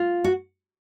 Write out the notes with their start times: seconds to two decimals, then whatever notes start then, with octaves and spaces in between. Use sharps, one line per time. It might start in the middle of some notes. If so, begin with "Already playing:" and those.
Already playing: F4
0.24 F#4